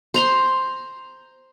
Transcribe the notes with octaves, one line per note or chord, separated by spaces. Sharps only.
C5 A#5 C6